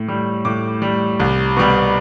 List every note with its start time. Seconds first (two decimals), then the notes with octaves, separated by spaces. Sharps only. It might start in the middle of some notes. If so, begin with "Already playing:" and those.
Already playing: A2
0.08 G3
0.45 A2 D6
0.82 G3
1.20 C2
1.57 B2 G3